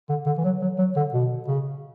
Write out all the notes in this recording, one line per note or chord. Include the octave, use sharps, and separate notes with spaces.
D3
D3
E3
F#3
F#3
F#3
D3
B2
C#3